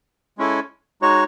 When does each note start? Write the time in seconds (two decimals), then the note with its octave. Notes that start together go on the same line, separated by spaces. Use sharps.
0.38 G#3 C#4 E4 A4
1.02 G#3 D#4 F#4 C#5